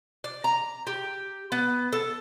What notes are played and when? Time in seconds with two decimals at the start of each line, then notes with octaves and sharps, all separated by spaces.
0.24 D5
0.44 A#5
0.87 G4
1.52 B3
1.93 A4